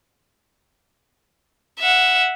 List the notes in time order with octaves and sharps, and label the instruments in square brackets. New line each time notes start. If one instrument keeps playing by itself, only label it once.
[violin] E5 F#5